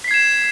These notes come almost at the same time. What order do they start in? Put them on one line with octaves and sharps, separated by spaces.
B6 C7 G#6 E7